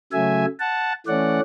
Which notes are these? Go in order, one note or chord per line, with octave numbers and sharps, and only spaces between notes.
C#3 F#3 A3 E5 G#5
F#5 A5
E3 A3 C#4 D5 F#5